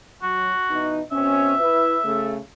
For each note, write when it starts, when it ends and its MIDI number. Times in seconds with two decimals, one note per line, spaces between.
0.23 0.51 54
0.23 0.95 66
0.70 1.01 47
0.70 1.01 52
0.70 1.01 63
1.12 1.54 47
1.12 1.54 60
1.12 1.54 61
1.12 2.31 76
1.60 1.97 64
1.60 1.97 71
2.04 2.37 49
2.04 2.37 57